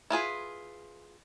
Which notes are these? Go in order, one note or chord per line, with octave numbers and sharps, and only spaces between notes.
E4 F4 G#4 B4